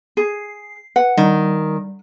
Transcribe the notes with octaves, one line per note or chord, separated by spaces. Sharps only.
G#4 C7
B4 F#5
D#3 G3